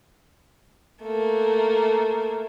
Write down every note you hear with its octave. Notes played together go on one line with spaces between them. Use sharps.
A3 A#3